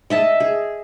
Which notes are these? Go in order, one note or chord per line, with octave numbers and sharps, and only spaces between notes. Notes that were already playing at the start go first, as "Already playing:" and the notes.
D#5 E5 A5
G#4